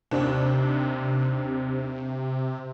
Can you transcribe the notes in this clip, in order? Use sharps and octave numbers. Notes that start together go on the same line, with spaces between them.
D#2 C3 C4 D4